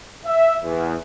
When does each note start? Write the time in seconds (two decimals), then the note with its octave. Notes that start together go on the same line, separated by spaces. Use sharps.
0.25 E5
0.63 E2